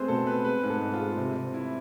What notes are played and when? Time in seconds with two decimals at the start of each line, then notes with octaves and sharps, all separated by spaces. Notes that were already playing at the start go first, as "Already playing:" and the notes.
Already playing: G#3 A3 C4 G#4 B4 C5
0.08 B2 A4
0.27 C4 B4
0.45 G#3 B4
0.63 G#2
0.70 A4
0.81 G#2
0.93 F4
1.00 G#3
1.17 C3
1.36 C3
1.54 E4